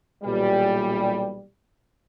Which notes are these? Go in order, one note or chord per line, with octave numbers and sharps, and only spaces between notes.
B1 A#2 E3 G3